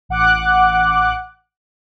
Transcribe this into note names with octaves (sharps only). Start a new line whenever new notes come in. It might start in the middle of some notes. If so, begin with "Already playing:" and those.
A1 F#5 D6 F#6